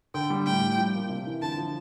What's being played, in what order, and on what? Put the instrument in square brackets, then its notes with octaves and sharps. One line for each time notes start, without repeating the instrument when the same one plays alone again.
[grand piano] D3 [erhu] G5
[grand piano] G3
[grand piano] A2 [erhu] G5
[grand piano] G3
F3
A#3
C3
E3
[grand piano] D3 [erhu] A5
[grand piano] F3